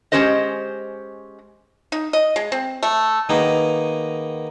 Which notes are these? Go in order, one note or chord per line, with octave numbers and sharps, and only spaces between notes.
G#3 A3 C#4 G4 C5 D#5
D#4
D#5
G#3
C4
A3
D#3 A#3 B3 D#4 G#4